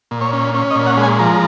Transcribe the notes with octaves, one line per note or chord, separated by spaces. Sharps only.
A#2
C#5
C#4
C#4
D#5
A#2
F#5
G#3
G#5
F3 A#5